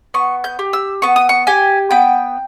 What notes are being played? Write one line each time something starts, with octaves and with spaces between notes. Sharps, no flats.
B3 C#6
G6
G4
E6
B3 C#6
D#6
C#6
G4 G#5
B3 G5